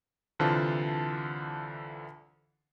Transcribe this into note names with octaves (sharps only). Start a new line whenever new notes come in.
C2 D3 E3 F4 C5 A5